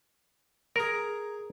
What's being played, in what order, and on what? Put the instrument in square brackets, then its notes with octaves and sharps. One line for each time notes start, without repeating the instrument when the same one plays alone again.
[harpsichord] G#4 A#5 [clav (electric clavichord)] A#4